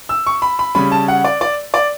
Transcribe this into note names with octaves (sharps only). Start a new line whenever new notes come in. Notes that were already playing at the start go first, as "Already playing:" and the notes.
E6
C#6
B5
B5
C#3 G3 C#4 B5
A5
F#5
D5
D5
D5